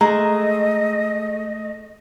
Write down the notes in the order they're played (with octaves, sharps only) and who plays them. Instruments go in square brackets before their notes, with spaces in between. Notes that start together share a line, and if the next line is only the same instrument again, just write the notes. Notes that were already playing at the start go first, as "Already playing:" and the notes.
[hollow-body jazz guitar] G#3 [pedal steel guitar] A3 [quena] D#5 [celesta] A#5